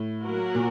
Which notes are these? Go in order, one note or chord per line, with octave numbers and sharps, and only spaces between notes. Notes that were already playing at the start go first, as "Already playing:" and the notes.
Already playing: A2
F#3 A#3 F#4 A#4
A#2